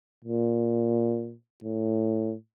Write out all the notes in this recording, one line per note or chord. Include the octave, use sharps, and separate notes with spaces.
A#2
A2